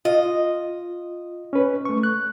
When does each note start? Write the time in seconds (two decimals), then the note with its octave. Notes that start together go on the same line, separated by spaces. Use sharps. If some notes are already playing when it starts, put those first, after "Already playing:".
0.05 F4 D#5
1.53 C#4 B4
1.85 A3 C#6
2.03 F#6